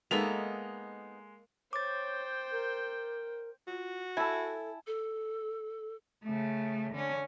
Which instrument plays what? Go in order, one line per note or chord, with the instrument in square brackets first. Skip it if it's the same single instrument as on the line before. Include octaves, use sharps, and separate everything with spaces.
[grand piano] G#3 F7 [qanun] A#3 A4 E5 [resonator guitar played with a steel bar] B3 D#4
[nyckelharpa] C5 G5 [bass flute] C#5 [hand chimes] D6 A6
[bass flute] A#4
[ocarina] F4 [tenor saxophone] F#4
[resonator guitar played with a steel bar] E4 [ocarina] A4 [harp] G#5 A5
[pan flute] A4
[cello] C#3 A3
D3 C#4